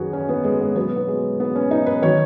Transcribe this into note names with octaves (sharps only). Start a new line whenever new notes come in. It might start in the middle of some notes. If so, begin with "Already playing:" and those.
Already playing: F#2 D#3 F#3 F#4 G#4 B4
C#4
B3
G#3
B3
B2 F#3 B3
B3
G#3
B3
C#4
D#4
B4
D#3 F#3 C#5